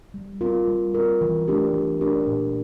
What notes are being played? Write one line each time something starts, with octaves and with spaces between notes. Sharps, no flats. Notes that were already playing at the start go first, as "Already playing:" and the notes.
G3
C4 F4 A#4
G3
C4 F4 A#4
E3
A3 D4 G4 A#4
E3
A3 D4 G4 A#4
A#2